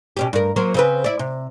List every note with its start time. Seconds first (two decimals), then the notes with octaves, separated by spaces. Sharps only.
0.17 B2 C#4 G4
0.33 G2 A#4
0.56 F#3 A#3 C5
0.74 C#3 C4 B4
1.04 E4 D5
1.19 C3